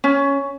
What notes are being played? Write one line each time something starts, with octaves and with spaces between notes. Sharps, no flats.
C#4